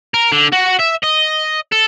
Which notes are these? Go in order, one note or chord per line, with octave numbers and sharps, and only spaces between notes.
A#4
D3
F#4
E5
D#5
A4